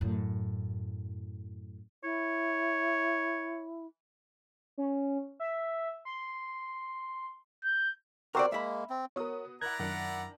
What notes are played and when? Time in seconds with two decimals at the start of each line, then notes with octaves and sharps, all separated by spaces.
0.01 F#2 A2
2.04 E4 C#5
4.78 C#4
5.40 E5
6.05 C6
7.65 G6
8.35 C4 F#4 G4 A#4 C5 D5
8.52 G#3 A#3 E5 B5
8.90 C4
9.16 B3 F#4 A#4 C#5 D#6
9.62 E4 A#4 D5 F#5 A#5 F#6 G#6
9.80 F#2 D#3 D4 F#5